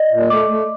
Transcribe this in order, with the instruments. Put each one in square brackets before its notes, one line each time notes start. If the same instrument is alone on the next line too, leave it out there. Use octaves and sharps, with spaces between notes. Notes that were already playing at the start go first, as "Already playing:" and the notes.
Already playing: [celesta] D5 D#5
[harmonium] A#2
[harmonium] A3 [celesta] D6
[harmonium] A3